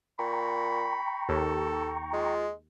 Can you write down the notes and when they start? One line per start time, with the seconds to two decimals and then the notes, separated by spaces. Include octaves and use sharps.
0.19 A#2 G5 A#5 B5 C#6
1.29 D#2 A4
2.13 G#3 F4